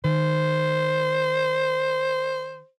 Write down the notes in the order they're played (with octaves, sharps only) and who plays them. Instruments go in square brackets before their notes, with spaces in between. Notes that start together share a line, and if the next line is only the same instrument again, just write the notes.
[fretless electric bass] D#3 [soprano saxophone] C5